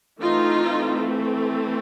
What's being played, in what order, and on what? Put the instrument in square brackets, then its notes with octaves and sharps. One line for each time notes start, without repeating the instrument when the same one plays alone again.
[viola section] E3 A3 C4 D#4 F4